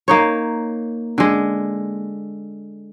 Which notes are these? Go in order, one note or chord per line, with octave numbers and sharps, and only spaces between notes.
A#3 D#4 C#5
D3 G#3